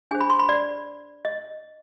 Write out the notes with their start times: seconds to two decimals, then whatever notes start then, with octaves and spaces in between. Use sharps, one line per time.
0.11 D4 G#4 C5 G#5
0.21 B5
0.30 C6
0.39 B5
0.49 D5
1.25 D#5